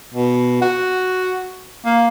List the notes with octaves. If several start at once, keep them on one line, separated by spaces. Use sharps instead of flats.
B2
F#4
A#3